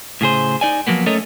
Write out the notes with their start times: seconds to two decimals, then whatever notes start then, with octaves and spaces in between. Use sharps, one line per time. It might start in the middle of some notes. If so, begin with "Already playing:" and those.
0.21 A2 C#3 G#4 C5
0.61 D#4 D5 G#5
0.87 F3 F#3 A#3 B3
1.06 A3 C#4 A4 A#4 C#5 D#5